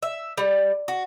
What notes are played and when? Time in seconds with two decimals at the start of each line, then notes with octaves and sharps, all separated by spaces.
0.03 E5
0.38 G3
0.88 F#4